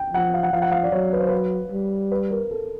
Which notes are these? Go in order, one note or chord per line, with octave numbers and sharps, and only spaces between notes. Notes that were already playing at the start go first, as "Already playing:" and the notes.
Already playing: G5
F3 F#5
F5
F#5
F3 F5
F#5
F5
D5
F#3 C#5
B4
C5
B4
G3
B4
A#4
A4